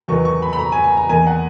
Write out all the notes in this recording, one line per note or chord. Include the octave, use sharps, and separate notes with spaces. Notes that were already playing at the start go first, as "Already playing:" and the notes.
E2 D#3 F#3 B3 C#6
C#6
B5
B5
A#5
G#5
G#5
A#5
E2 D#3 A#3 G#5
F#5